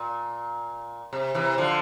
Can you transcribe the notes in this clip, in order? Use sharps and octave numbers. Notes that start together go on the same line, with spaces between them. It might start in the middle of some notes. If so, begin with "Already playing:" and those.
Already playing: A#2
C3
C3 E3
D3 F3